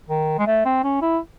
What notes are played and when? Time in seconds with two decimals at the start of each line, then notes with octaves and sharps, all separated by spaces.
0.09 D#3
0.39 G#3
0.47 A3
0.65 C4
0.84 C#4
1.02 E4